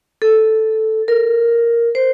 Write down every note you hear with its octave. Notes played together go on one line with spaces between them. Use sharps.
A4
A#4
C5